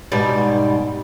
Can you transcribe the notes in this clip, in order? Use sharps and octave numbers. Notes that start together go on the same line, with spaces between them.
G#2 B2 G3